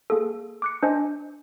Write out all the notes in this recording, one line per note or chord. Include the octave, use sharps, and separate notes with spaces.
A#3 G#4 A4
D6 F#6 C#7
D4 C5 D#5 G#5